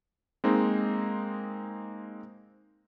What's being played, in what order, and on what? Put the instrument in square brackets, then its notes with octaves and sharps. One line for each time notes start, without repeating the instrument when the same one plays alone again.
[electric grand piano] G#3 A#3 C4 D#4